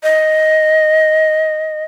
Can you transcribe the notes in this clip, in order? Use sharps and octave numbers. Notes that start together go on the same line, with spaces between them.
D#5